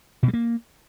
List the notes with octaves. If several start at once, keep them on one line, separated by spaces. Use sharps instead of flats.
B2
G3
A#3